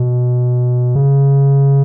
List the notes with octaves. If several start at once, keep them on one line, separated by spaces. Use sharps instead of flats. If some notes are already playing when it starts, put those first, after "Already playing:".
Already playing: B2
C#3